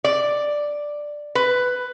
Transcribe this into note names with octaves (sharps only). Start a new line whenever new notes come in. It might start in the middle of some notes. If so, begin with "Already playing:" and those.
D5
B4